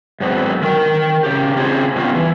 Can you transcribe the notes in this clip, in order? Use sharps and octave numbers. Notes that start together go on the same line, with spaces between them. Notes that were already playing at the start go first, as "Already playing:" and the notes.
G#2 F#3 B3 C4
D#3 A#4 G5
C#3 G4
C#3 C4 F4 G#4
B2 G3 B3 C#4 F4
E3